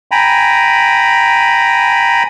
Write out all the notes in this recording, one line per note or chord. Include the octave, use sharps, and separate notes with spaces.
G5 G#5 A#5 B5